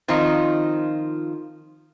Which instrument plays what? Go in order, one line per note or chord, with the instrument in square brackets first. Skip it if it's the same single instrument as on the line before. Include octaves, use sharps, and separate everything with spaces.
[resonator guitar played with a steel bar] D#3 F3 C4 D#4 F4